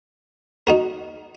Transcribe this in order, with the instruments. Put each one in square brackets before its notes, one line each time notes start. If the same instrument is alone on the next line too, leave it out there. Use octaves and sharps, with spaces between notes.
[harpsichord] D#4 F#4 A#4